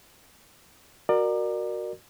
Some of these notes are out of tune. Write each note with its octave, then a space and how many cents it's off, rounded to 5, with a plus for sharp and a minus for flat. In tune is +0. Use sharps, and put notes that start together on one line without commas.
F#4 +0 A#4 +0 D5 +30